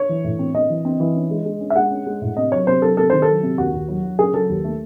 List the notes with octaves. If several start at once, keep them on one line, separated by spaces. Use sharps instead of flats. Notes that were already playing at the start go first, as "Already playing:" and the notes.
Already playing: C#5
E3
A2
C4
C4 D#5
E3
C4
E3
C#4
G#3
G#3
C#4
E5
G#3 F#5
C#4
G#3
A2
C3 D#5
F#3 C#5
C3 C5
F#3 A4
C3 A4
D#3 C5
A4
F#3
C3
D#2 F#4
D#2
F#3
F#3
C#3 G#4
F#3 A4
D#2
A3